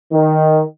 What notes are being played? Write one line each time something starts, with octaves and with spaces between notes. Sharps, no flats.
D#3